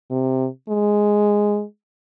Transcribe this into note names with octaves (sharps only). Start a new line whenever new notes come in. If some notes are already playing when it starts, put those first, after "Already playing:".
C3
G#3